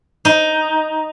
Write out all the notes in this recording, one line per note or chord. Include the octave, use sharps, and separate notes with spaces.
D#4